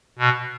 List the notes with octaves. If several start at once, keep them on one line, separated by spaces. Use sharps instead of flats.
B2